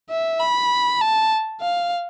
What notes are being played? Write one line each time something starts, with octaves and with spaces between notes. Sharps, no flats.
E5
B5
A5
F5